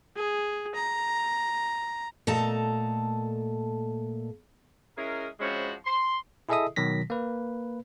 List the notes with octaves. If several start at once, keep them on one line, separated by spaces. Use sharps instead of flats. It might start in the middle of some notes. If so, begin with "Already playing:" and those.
G#4
A#5
A#2 A3 A4 D#5 A5 A#5
G#3 C#4 E4 G#4 A#4
F3 G#3 C4 C#4 E4 F#4
C6
E4 G#4 A4 D#5 E5 D#6
B2 D#3 F#3 A#6 B6
A#3 B4